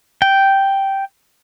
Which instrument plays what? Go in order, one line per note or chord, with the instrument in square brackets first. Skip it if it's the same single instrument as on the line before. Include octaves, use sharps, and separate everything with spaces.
[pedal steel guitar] G5